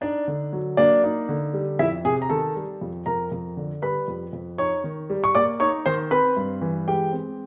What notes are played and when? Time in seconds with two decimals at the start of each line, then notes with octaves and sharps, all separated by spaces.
0.01 D4 D#4 D5
0.28 D3
0.53 F#3
0.77 A#3 D4 D5
1.04 D#4
1.29 D3
1.53 G3
1.79 F2 E4 E5
2.05 C3 G#4 G#5
2.22 A#5
2.29 D#3 A4 A5
2.56 G3
2.81 F2
3.06 F2 A#4 A#5
3.32 F2
3.57 D3
3.82 G3 B4 B5
4.08 F2
4.33 F2
4.58 D#4 C#5 C#6
4.84 D#3
5.10 G3
5.24 C#6
5.35 A#3 D5 D6
5.60 D#4 C#5 C#6
5.86 D#3 C5 C6
6.11 C4 B4 B5
6.37 G2
6.61 E3
6.87 G#3 G4 G5
7.13 C4